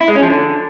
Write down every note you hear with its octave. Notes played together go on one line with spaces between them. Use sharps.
E4
G#3
C#4
F3
D3